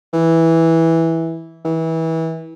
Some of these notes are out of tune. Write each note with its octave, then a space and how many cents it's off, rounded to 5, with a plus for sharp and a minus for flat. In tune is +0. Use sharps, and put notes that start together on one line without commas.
E3 -10
E3 -25